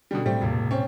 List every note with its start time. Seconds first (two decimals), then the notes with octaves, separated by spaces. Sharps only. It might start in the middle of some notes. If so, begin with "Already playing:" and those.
0.11 B2 D3 G3 C#4
0.26 A2 G3 A3 C4
0.41 E1 A2 C3 A#3
0.71 C4 C#4